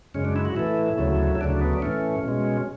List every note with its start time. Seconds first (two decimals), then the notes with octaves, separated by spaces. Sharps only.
0.14 F#2 C#3 G#3 C#4
0.25 D4
0.36 E4
0.45 F#4
0.56 A2 E3 A3 E4
0.98 D2 C#3 F#3 A3
1.35 E4
1.41 D2 C#3 F#3 A3 D4
1.61 B3
1.73 D4
1.82 A2 E3 A3 C#4
2.24 B2 G#3